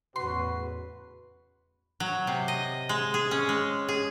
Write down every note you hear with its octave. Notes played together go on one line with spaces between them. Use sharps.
E2 A2 C#3 F#4 B4 C6
F#3
C3
D#5
G#3
G#4
C#4
G#3
G#4